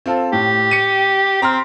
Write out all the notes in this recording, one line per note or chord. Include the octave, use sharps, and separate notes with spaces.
C4 F4 A4
A2 G4
C#7 D#7
C4 A#5 C6 F6